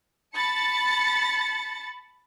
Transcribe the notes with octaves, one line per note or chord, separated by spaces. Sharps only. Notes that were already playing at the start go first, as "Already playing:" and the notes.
A5 B5 A6 C#7